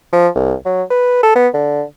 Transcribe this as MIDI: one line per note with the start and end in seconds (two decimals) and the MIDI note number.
0.13 0.28 53
0.35 0.54 36
0.65 0.83 54
0.90 1.18 71
1.23 1.35 69
1.35 1.48 59
1.54 1.83 50